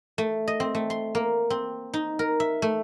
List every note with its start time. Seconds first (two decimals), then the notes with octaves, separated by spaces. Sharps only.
0.18 A3
0.48 D#5
0.60 C4
0.75 A3
0.90 C6
1.15 A#3
1.50 C4
1.94 D#4
2.19 A#4
2.40 E5
2.62 A3